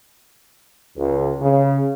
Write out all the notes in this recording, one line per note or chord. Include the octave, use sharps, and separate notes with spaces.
C#2
C#3